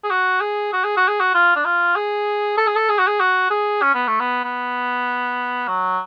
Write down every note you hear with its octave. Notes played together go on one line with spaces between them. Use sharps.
G#4
F#4
G#4
F#4
G#4
F#4
G#4
F#4
F4
D4
F4
G#4
A4
G#4
A4
G#4
F#4
G#4
F#4
G#4
C#4
B3
A3
B3
B3
F#3